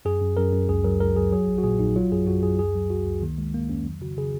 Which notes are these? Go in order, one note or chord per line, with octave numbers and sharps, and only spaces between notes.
F#2 G#4
F#2
F#2 A#4
F#2
C#2 G#4
F#3 A#4
C#2 A#4
F#3 G#4
F#3 G#4
A#1
F#4
A#2 G#4
A#1 D#4
F#3 F4
F#2 G#4
F#2 F#4
F#2 G#4
C#2 G#4
F#3
C#2 F#4
C#2
D#3 A#3
D#3 G#3
D#3 A#3
F2 C#4
F#3
C#3 F#4
C#3 G#4